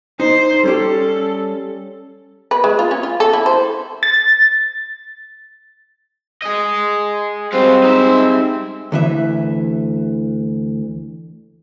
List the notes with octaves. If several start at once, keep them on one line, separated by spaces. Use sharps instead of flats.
D#4 C5
G3 C#4 G4 A4
B4
G#3
F4
C#4
F4
A4
E4
C5
A6
G#4 D#5
G3 G#3 C4 F#4 F5
D#4 E5
D2 E3 E5